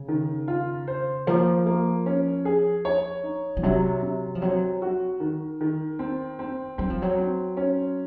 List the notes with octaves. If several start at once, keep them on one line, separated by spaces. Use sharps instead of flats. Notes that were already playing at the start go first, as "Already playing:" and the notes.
Already playing: C#3
D#3
F4
C5
F3 A#3
A#3
C#4
G#4
C#5
D#4
F3
C3 F#3
C3
F3
F#3 C4
F#4
D#3
D#3
C4
C4
F#3 C4
F3
F#3
C4
C#4